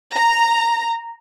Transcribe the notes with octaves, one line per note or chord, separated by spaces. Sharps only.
A#5